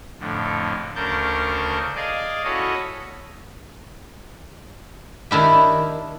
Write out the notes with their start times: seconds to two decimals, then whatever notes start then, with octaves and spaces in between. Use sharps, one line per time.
0.20 F2 A2 D3
0.95 D2 C#3 D4 A#4 A5 G6
1.96 G#4 D5 D#5 F5
2.44 C#4 E4 F#4 A4 C#5 D#5
5.31 D#3 D4 E4 G4